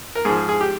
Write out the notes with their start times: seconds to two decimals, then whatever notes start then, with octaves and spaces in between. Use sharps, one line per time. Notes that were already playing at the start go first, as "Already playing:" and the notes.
0.15 A#4
0.25 G#2 G#4
0.29 F3
0.37 G#4
0.49 G#4
0.61 G4